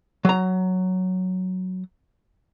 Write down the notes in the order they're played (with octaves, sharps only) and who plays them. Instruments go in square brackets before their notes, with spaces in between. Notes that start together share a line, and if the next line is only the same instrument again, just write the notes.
[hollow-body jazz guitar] F#3 A#5